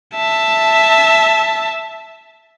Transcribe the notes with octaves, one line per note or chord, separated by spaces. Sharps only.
E5 A5